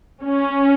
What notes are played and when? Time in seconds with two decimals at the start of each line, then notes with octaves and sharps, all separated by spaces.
0.23 C#4